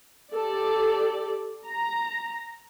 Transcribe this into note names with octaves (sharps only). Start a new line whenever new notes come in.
G4 A4 D5
A#5